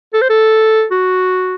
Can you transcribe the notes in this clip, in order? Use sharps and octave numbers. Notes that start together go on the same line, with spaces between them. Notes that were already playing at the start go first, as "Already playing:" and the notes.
A4
C5
A4
F#4